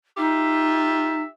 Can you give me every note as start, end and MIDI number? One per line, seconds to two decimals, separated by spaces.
0.17 1.21 63
0.17 1.29 65
0.17 1.29 67
0.17 1.29 76